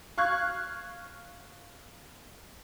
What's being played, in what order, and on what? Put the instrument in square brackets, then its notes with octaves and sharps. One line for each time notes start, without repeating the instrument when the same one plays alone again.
[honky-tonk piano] F5 C#6 F6 F#6 G#6